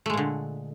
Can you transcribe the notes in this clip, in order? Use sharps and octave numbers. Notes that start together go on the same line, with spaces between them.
A#2 D3 G#3 A3